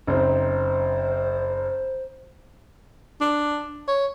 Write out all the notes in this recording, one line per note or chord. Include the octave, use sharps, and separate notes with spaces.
F#1 C4 D#4 C5
D4
C#5